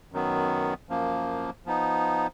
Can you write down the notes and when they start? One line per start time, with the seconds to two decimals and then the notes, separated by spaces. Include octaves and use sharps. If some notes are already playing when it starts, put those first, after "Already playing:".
0.12 F#2 D#3 F#3 B3
0.89 F#2 F3 A#3
1.66 F3 B3 D#4